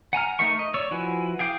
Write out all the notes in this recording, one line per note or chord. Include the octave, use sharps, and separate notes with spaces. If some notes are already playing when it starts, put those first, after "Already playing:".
F#5 G#5 A#5 F6
A3 D#4 A#4 E5 C#6
D#5
C#5 D5 C#6 E6
F3 E4 F#4 B4 G#5
G#4 F5 G5 D6